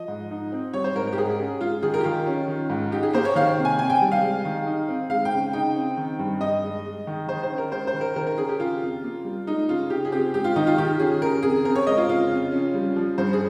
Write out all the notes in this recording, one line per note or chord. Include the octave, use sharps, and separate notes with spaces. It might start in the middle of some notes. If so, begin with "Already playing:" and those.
Already playing: F3 D#5
G#2
D#4
C4
G3 C#5
C5
G#2 A#4
A#4
G4
G#2 G#4
C#4
G#3 F4
D#3 G#4
A#4
G4
D#3 F4
C#4
D#3
G#2
D#4 G4
G#4
A#3 C5
C#5
D#3 F5
C3
G#5
C4 G#5
G5
G3
F5
G#3
D#3
D#4
C4
G#3 F5
G5
C#3
D#4 G5
C4
D#3
G2
G2 D#5
G#3
G#3
D#3
D#3 C5
C5
C#4
A#4
G#3 C5
C5
D#3
A#4
D#3 A#4
A#4
C#4 G#4
G4
C#3 F4
F2
A#3
G3
G#3 D#4
C#3 F4
C#3 G4
G#4
C4 G4
G#3 G4
F4
D#3 D#4
F4
D#3 G4
C#4 G#4
C#3 A#4
F2 G#4
C4 A#4
C#5
G#3 D#5
F4
C#3 F4
F2
C#4
G3
F3
G2 C5
G#4